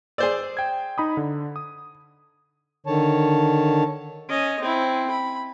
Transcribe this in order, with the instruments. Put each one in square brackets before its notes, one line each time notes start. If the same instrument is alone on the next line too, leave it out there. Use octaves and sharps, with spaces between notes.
[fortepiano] G#4 C5 D5 [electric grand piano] E6
[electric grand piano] G5 G#6
D#4 B5 D#6
D3
D#6
[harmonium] D3 D#3 C#5 A5
[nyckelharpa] C#4 D#5
C4 E4
B5